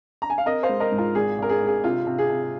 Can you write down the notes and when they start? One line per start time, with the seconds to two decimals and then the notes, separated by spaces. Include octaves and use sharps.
0.22 A#5
0.30 G#5
0.38 F5
0.46 C4 A#4 D#5
0.63 C5 F5
0.69 G#3
0.80 A#4 D#5
0.92 G#2
0.98 F4 A#4
1.15 G#1 G#4
1.38 G#1 A#4
1.49 G#4
1.61 G#2
1.67 G#4
1.84 C3 F4
2.06 C3
2.18 G#4
2.29 C3